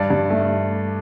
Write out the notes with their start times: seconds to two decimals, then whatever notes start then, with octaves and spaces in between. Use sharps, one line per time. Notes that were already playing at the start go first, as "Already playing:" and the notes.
Already playing: G2 D5
0.10 G2
0.30 A3